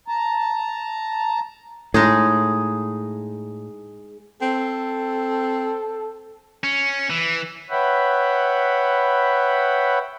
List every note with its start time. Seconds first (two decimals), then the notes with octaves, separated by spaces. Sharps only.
0.08 A5 A#5
1.94 A2 G#3 D#4 G#4
4.42 C4 A4
6.64 C#4
7.10 E3
7.70 B4 C#5 E5 F#5 G5 B5